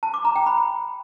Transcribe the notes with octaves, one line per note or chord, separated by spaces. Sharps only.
A5
D6
A#5
G5
B5